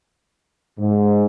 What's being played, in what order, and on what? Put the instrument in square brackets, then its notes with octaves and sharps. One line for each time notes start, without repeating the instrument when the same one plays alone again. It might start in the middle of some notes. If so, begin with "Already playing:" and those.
[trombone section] G#2